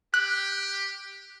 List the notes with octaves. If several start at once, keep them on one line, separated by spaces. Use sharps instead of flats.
G4 F#6